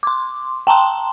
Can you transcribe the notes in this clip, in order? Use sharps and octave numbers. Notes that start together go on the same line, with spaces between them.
C6 D6
G5 A5 A#5 C6